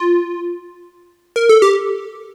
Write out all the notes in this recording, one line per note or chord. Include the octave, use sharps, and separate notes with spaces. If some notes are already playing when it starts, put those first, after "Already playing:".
Already playing: F4
A#4
A4
G4